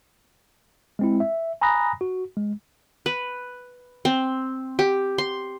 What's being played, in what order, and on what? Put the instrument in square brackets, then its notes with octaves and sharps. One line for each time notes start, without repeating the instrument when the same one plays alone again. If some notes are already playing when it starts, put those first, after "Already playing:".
[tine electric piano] G#3 C4 E4
E5
G#5 A#5 B5 D#6 F#6 A#6
F#4
G#3
[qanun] B4
C4
G4
C6